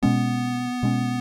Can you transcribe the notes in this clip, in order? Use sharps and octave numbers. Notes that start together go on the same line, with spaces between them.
B2 G#3 B3 C#4
B2 G#3 C#4